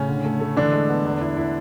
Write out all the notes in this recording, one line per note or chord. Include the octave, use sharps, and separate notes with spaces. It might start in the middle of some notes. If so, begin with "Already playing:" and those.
Already playing: A2 C#3 C#4
D3
A3
A3
D3 E3 D4
G#3
B3
E2
E4
E4